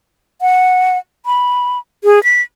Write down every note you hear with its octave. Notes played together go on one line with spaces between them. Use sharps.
F#5
B5
G#4
B6